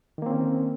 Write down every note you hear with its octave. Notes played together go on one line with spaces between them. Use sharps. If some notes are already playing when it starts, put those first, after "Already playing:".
D#3 A#3 C4 C#4